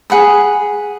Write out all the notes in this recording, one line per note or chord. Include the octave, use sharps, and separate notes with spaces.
G#4 F#5 B5 D#6